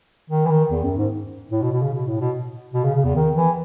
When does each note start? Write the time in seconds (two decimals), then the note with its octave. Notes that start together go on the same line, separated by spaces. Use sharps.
0.30 D#3
0.45 E3
0.50 D#3
0.71 E2
0.83 F#2
0.97 G#2
1.51 A2
1.62 B2
1.72 B2
1.82 C#3
1.92 B2
2.06 A2
2.20 B2
2.74 B2
2.84 C#3
2.95 C#3
3.04 E2
3.15 D#3
3.35 E3